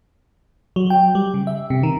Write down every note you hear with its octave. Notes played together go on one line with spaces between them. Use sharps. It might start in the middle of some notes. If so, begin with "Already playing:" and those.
F#3
G5
G3
C#3
E5
C3
D#3